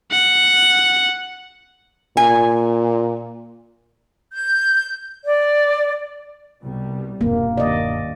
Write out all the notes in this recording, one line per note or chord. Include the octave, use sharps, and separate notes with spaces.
F#5
A#2 G#5
G6
D5
C2 B2 G3
E1 G2 C3 A#3
D#2 D5 D#5